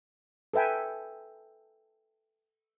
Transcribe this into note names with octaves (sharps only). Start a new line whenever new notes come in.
A4 B4 E5 G5 G#5